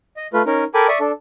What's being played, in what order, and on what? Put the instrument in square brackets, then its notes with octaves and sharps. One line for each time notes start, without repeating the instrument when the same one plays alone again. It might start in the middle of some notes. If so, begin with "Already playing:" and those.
[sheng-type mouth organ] D#5
A3 F4 B4
C#4 D#4 A#4
A4 A#4 G5 G#5 B5 D6
D5 E5 C#6 D#6
D4 A4